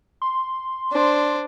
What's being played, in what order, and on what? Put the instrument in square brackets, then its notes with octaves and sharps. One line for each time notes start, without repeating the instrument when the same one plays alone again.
[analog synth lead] C6
[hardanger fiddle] D4 C5